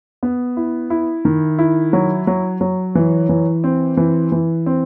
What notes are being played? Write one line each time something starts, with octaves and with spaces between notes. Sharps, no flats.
B3
E4
E4
D#3
E4
F#3
F#3
F#3
E3
E3
C4
E3
E3
C4